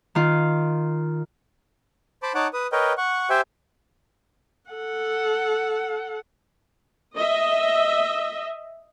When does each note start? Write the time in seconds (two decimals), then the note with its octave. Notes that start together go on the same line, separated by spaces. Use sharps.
0.15 D#3 F4
2.23 C5 A5 B5 D6
2.35 D#4 C#5 F#5 A5 D6
2.53 B4 D#6
2.72 A#4 B4 C#5 D#5 G5
2.97 F#5 C#6
3.30 G4 C5 E5 G5 G#5
4.71 A4 F#5
7.16 D#5 E5